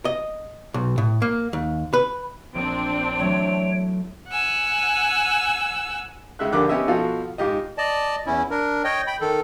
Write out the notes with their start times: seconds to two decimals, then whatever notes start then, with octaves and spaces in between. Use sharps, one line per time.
0.05 D#5
0.74 B1
0.98 A2
1.22 A#3
1.53 D#2
1.93 B4
2.55 A#1 C4 D4 G#4 D7
3.19 E3 F#3 A3 C#5
4.29 F#5 G#5 E6
6.39 C#2 C#3 G#3 E5 F#6
6.52 A#1 D3 A#3 G4 D6 F#6
6.69 B3 C#4 G4 D#5 E5
6.88 B2 F3 F4 F#4 A4
7.38 G#2 F4 G4 D#5
7.78 D5 D#5 A5
8.27 E2 C#4 E4
8.50 D4 A#4
8.84 C#5 D#5 G5
9.07 G5 B5
9.21 D#3 A4